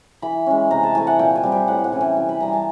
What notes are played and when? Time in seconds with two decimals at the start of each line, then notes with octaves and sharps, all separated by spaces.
0.22 E3 B5
0.46 G#3 C#4
0.71 C3 A#5
0.83 A5
0.95 E3 A3 G#5
1.07 F#5
1.19 A#2 G5
1.35 G#5
1.43 G3 C4
1.52 G5
1.68 A2 F#5
1.84 F#5
1.93 E3 A3 C#4 G#5
2.01 G5
2.17 C3 G#5
2.29 B5
2.40 E3 G3 A#5
2.48 G#5 A5